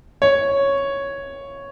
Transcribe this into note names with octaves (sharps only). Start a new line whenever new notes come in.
C#5